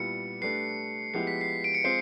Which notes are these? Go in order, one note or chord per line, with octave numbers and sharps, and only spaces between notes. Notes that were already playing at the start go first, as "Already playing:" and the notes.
Already playing: A#2 G3 B3 E4 C#7
A3 D4 G4 B4 C7
F3 G#3 B3 E4 G4 C7
B6
C7
D7
C#7
G#3 C4 F4 G#4 C5 C7